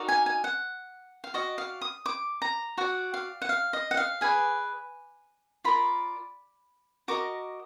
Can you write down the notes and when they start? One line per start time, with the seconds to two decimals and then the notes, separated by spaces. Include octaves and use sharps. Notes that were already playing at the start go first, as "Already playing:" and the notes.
Already playing: D#4 F#4 A#4 D5
0.09 G#5
0.26 G#5
0.44 F#5
1.24 F5
1.34 F#4 D5 D#5
1.58 F5
1.81 D#6
2.06 D6
2.42 A#5
2.77 F#4 D5 F#5
3.14 F5
3.42 F#5
3.49 F5
3.73 D#5
3.91 F#5
3.97 F5
4.21 G#4 B4 D5 G#5
5.64 F4 A#4 D5 B5
7.08 F#4 A#4 D#5 D6